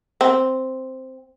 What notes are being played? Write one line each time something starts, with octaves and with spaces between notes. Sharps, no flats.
C4